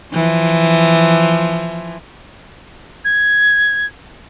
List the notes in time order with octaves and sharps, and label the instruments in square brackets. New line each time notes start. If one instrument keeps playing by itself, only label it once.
[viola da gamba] E3 F3
[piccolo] G#6